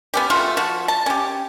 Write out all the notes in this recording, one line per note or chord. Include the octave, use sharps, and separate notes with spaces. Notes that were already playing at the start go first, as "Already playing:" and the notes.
B3 C#4 G4
A3 F4 F#4 F5
F3 F#4
A5
C#4 G4